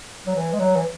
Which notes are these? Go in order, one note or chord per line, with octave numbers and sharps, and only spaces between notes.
F#3
E3
G#3
F#3
E3